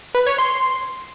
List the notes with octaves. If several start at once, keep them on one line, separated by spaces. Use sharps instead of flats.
B4
C#5
C6